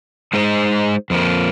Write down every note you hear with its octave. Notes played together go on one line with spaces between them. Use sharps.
G#3 D#4 G#4 C5 D#5
F2 F3 A#3